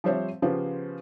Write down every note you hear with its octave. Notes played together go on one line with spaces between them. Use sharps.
F3 G3 C4 C5 C#5 E5
C#3 F3 B3 F4 G4 C5